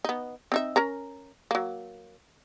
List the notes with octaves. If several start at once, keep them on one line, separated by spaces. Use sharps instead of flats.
B3 D#4
C4 D#4 E5
C#4 A#4 A#5
F#3 A#3